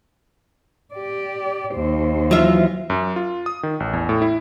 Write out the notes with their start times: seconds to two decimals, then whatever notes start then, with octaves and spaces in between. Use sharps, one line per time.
0.94 G4 D5
1.74 D#2 C5
2.31 E3 F#3 F4 E5
2.90 F#2
3.16 F4
3.46 D#6
3.63 D#3
3.80 A1
3.93 E2
4.09 A2
4.22 E4